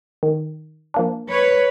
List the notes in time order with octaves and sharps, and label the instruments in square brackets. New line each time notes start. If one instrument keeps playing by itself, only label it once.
[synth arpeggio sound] D#3
F3 A#3 D4
[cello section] B4 C#5